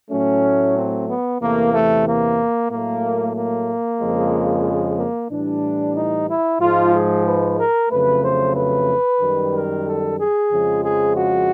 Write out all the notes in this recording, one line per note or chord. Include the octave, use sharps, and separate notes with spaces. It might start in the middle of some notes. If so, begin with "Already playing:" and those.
A2 F#3 A3 C#4
C4
B3
E2 C3 E3 A3 A#3
A3
A#3
A2 F#3 A3 A#3
A#3
F2 C#3 F3 G#3
A#3
A2 E3 G3 D4
D#4
E4
G#2 F3 G#3 F4
G#4
B4
A#4
F2 C#3 F#3 A3 B4
C5
B4
F#2 D#3 G3
A#4
A4
G#4
F2 C#3 F3 G#3
G#4
F#4